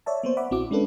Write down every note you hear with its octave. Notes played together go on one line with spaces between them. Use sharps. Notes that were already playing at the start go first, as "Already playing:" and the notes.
C#5 D5 E5 A5
A#3 B3 C5
E5 F#5 B5 D6
A#1 C4 E4 F#4 D6
G#3 C#4 D4 A4 B4